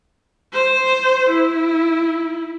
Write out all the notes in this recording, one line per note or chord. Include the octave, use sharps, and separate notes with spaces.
C5
E4